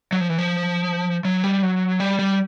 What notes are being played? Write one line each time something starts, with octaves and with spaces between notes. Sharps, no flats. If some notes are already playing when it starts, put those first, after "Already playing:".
F#3
F3
E3
F3
F#3
G3
F#3
G3
G3